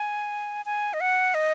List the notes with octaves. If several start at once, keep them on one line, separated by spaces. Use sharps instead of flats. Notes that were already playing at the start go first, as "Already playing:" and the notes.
Already playing: G#5
G#5
D#5
F#5
D#5